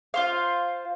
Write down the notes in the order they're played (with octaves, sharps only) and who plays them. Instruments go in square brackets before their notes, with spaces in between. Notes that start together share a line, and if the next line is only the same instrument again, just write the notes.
[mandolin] F4 C5 F5